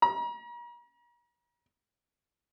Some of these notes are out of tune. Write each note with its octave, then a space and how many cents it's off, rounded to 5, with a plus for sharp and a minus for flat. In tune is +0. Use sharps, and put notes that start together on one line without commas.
A#5 +40